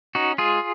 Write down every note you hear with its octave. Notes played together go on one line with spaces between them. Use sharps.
C#4 D#4 F#4
G#3 F4 G#4